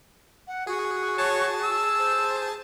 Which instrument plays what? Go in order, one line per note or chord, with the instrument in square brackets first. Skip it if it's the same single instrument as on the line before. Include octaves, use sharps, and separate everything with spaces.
[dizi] F#5
[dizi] F#4 [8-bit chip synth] G#4
[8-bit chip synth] G#4 A5 [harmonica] C#5
[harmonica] E6
[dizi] C5